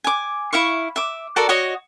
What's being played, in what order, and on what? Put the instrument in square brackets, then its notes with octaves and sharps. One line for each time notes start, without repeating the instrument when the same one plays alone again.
[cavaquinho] G#5 D6
E4 E5 F5 C#6
E5 D6
F#4 A4 A#4 D5
F#4 C#5 D#5